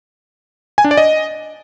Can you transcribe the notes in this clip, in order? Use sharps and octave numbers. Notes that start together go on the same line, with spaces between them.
G#5
D4
D5
D#5